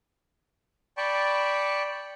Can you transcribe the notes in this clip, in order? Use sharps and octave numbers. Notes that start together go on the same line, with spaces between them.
D5 G5 A5 B5 C#6